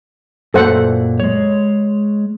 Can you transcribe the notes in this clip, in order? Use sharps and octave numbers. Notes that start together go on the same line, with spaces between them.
F#2 A#2 A4 C5 F#5
G#3 C#5